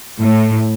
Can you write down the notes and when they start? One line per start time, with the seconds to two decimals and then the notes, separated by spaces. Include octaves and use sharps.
0.21 A2